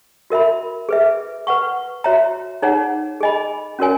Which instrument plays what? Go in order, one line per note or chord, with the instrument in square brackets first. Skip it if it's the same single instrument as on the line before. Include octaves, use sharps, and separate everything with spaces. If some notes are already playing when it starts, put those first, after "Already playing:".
[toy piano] F#4 A#4 E5 B5
G#4 B4 E5
B4 F#5 C#6
F#4 C#5 E5 A#5
D#4 G#4 C#5 F#5 A#5
G#4 D#5 G#5 B5
C#4 F#4 A#4 C#5 G#5